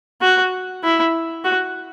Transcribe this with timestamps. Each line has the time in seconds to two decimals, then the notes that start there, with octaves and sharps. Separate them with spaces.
0.21 F#4
0.83 E4
1.44 F#4